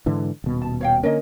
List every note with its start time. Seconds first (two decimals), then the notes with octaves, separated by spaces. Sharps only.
0.06 G#2 D3 E3
0.44 D#1 B2
0.62 A5
0.81 C#5 F5 G5
1.03 D3 A#3 C#4 A#4 D#5